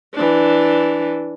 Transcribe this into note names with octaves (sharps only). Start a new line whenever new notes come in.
E3 D4